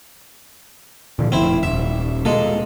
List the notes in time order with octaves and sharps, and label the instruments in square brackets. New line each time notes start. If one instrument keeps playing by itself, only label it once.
[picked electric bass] A#2 D3 F3
[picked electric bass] F1 F2 [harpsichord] C4 E4
[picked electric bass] D#1 [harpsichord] E5
[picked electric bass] B2 A#3 [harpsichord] G#3 A4